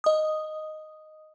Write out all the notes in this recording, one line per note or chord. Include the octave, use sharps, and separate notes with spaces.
D#5 D#6